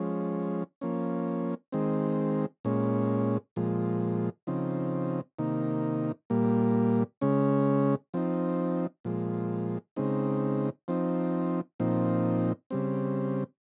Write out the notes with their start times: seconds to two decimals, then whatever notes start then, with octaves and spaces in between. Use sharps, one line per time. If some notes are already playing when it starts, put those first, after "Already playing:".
Already playing: F3 G#3 C#4
0.81 F3 A#3 C#4
1.72 D#3 G#3 C4
2.65 A#2 G#3 C#4
3.56 A#2 F3 G#3
4.47 C#3 F3 C4 D#4
5.39 C3 D#3 A#3 D#4
6.30 A#2 G3 A#3
7.21 C#3 G#3 C#4
8.14 F3 C4 D#4
9.05 A#2 F3 G#3
9.96 C#3 G#3 C4 D#4
10.88 F3 C4 D#4
11.80 A#2 F3 C4 D#4
12.70 C#3 G3 C4